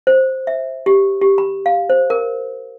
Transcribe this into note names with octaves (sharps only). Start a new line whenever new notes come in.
C5
E5
G4
G4
B5
F5
C5
A#4